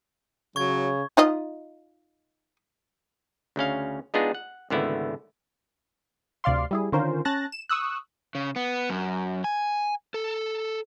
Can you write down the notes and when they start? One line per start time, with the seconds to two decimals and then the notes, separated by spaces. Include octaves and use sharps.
0.56 C#3 F#3 C#6 G#6
1.17 D#4 F4 D#5
3.56 D2 C#3 C#4 F5
4.14 G#3 B3 D4 D#4 F4 G#4
4.35 F#5
4.70 G#1 C#2 D3 A3 B3 E4
6.44 D2 C3 D5 F5 C6
6.71 G3 E4 G#4
6.92 D3 D#3 C#4 F4 A#4 C5
7.25 C#4 A5 F#6 A6 A#6
7.52 E7
7.69 C#6 D#6 E6 F#6
8.35 C#3
8.56 B3
8.90 F#2
9.44 G#5
10.14 A4